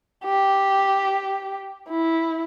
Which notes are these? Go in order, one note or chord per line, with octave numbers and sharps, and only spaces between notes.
G4
E4